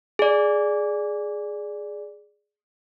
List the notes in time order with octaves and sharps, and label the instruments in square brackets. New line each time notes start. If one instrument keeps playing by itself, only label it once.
[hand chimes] G#4 D5